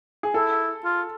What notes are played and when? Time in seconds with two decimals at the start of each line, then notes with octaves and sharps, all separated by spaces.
0.23 G#4
0.34 E4 A4
0.84 F4